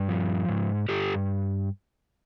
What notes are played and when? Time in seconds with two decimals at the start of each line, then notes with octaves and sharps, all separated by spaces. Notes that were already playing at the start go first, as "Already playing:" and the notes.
Already playing: G2
0.09 F3
0.49 G#2
0.89 G2 G4 A4